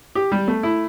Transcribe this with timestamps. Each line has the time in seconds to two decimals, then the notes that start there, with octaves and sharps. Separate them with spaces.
0.15 G4
0.32 G3
0.48 A3
0.63 E4